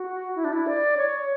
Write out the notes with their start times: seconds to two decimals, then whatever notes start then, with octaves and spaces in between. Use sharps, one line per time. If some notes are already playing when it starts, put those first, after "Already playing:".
Already playing: F#4
0.36 E4
0.45 D4
0.53 E4
0.67 D5
0.97 C#5